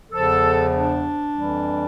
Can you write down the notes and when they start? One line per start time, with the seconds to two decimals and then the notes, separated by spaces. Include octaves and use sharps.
0.12 E2 C#3 F3 A4
0.73 D4
1.34 F2 E3 G3